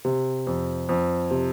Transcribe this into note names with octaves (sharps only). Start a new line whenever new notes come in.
C3
F2
F2
C3